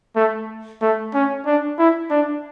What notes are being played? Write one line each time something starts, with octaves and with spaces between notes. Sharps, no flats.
A3
A3
C#4
D4
E4
D4